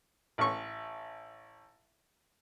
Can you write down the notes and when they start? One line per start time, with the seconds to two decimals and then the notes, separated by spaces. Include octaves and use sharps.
0.38 A1 C#6